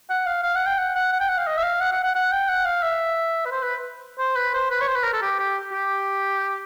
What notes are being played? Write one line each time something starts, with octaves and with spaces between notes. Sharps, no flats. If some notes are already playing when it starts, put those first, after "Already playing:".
F#5
F5
F5
F#5
G5
F#5
F#5
F#5
G5
F#5
F5
D#5
E5
F5
F#5
F#5
F#5
F#5
G5
F#5
F5
E5
B4
C5
B4
C5
B4
C5
B4
C#5
C5
B4
A#4
A4
G4
G4
G4